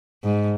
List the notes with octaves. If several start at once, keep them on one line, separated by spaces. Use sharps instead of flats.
G#2